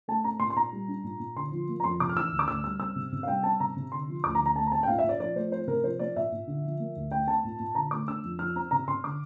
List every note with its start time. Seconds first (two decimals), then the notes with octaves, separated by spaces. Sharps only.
0.08 A3 A5
0.24 C4 A#5
0.40 A#2 C6
0.50 C6
0.56 A#2 A#5
0.72 G3
0.88 D4
1.04 A#2
1.19 A#2
1.36 D3 C6
1.52 F3
1.69 A#3
1.80 A#5
1.84 F2 C6
2.00 C3 D6
2.09 F6
2.16 E3 E6
2.31 D2
2.39 D6
2.48 D2 E6
2.64 G3 E6
2.79 C4 E6
2.96 C3
3.12 C3
3.23 F5
3.28 G3 G5
3.43 C4 A5
3.60 C3 A#5
3.77 C3
3.92 D3 C6
4.08 F3
4.24 D2 D6
4.35 A#5
4.39 D2
4.46 A#5
4.56 A3 A5
4.67 A#5
4.71 C4 A5
4.83 G5
4.88 A#2 F5
4.99 E5
5.04 A#2
5.09 D5
5.20 F3 D5
5.36 A3 C5
5.52 C4 C5
5.67 C3 A#4
5.83 F3 C5
5.99 A#3 D5
6.16 A#2 E5
6.32 A#2
6.47 D3
6.64 F3
6.80 A#3
6.96 D2
7.11 A3 G5
7.27 C4 A5
7.44 A#2
7.60 A#2
7.75 D3 A#5
7.91 A3 D6
8.08 D4 E6
8.24 F2
8.39 F3 F6
8.55 C4 A#5
8.71 C3 A#5
8.88 C3 C6
9.04 D3 D6